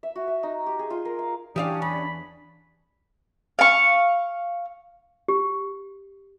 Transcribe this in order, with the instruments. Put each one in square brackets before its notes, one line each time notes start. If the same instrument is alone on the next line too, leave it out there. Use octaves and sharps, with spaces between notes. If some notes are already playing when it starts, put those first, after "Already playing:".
[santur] E5
F#4
E5
D#4
G4
G#4
F4
A#4
F5
[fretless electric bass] E3 [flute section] C#4 D4 D5 [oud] G4 E5 F5 [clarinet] D#6
[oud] E2 [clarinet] B5
[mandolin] F5 C#6
[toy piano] G4